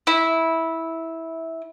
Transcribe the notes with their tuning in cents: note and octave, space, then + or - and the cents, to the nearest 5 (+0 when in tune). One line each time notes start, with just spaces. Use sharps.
E4 -15